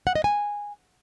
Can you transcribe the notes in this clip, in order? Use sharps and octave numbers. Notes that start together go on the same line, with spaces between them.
F#5
D#5
G#5